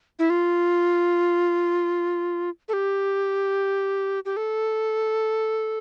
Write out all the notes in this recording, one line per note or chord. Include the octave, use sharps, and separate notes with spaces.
E4
F4
A4
G4
G4
A4